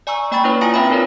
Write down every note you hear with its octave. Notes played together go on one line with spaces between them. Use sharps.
D5 G#5 A#5 C#6 E6
A#3 D5 G5 B5 C#6 A6
C#4 E4 B4 C#5
E4 F4 F5 G#5 A#5 D#6
C4 B4 D5 E5 G5 B5
D#4 F4 A#4 B4 C#5 D5